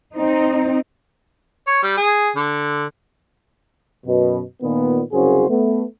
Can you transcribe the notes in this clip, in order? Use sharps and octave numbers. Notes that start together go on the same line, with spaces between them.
C4 D#4
C#5
G3
G#4
D3
F#2 B2
A#2 D#3 B3
C2 F#2 C#3 F#4 G#4 C5
A3 B3